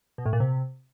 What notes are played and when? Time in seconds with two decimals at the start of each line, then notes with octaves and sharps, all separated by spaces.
0.18 B2
0.26 A2
0.33 A#2
0.40 C3